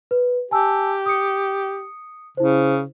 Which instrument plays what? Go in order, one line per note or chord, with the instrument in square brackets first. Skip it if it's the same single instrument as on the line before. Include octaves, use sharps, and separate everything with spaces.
[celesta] B4
[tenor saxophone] G4 [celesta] G#5 A5 E6
[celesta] D#6 C#7
[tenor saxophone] C#3 [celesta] E4 C5